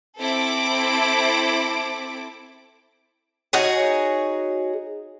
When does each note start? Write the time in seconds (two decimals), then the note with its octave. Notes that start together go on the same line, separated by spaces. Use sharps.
0.19 C4 E4 A4 D6 D7
3.53 D#4 F#4 G#4 C#5